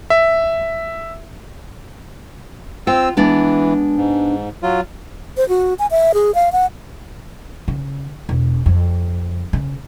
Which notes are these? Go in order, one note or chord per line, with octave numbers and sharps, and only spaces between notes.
E5
C4 F4 G5 E6
E3 G#3 B3 D4
G#2
F#3 F4
C5
F#4
G#5
E5
G#4
F5
F#5
C#3
E1
F2
C#3